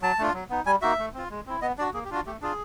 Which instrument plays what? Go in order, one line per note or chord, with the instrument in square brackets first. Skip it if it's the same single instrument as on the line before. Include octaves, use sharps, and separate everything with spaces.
[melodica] F#3 A5
A3 D4 F4
F#3
B3 D#4
G3 G#5
A#3 D#4 F#4 E5
A3
C4 F4
G#3
C4 E4
B3 D#5
D4 F#4 D5
A#3 G#4
G4
D4 F4 F#4
A3 G4
D4 F4 G#4